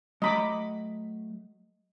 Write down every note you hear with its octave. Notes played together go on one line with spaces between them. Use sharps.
F#3 A3 D#5 A#5 B5 D6